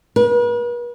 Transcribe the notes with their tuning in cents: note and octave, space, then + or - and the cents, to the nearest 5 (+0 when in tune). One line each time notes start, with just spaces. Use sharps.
B4 -45